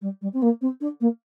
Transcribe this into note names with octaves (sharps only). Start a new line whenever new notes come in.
G3
G3
C4
A#3
C4
D4
A#3